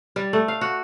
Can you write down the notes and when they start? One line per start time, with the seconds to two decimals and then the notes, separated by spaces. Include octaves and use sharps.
0.16 G3
0.33 A3
0.48 F5
0.61 F#4